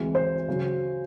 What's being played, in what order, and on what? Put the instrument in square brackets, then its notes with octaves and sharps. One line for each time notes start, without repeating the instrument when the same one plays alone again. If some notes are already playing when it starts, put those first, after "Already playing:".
Already playing: [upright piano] D2 C3 E3 G#3
C5
C#3 F#3